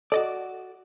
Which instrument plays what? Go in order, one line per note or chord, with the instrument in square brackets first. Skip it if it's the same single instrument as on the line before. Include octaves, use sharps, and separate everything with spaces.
[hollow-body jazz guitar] F#4 D5 [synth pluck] A4 D#5 D6